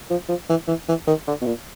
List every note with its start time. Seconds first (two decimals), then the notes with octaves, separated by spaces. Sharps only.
0.10 F3
0.29 F3
0.49 E3
0.68 E3
0.88 E3
1.07 D#3
1.27 D3
1.41 B2
1.46 A#2